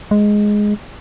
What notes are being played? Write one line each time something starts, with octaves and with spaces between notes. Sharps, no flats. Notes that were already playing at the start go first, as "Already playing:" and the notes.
G#3